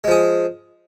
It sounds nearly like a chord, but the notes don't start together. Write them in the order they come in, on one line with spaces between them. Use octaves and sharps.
G#3 F3 G#4